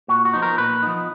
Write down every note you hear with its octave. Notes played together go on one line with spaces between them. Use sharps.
A#2 F#4
F#4
F3 B3 D#4
A#4
A#2 B4
F3 B3 D#4